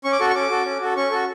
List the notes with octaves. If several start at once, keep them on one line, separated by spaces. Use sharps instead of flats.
C#4 C#6
D6
F#4 A4 C#6
C#6
C#4 D6
F#4 A4
C#4
F#4 A4
C#4 C#6
F#4 A4